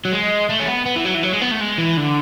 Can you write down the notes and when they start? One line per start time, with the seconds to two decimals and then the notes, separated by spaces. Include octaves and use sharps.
0.05 F#3
0.12 G#3
0.50 A3
0.60 C#4
0.68 B3
0.86 B3
0.96 E3
1.05 F#3
1.14 E3
1.23 F#3
1.33 G#3
1.41 B3
1.51 A3
1.60 G#3
1.78 E3
1.97 D3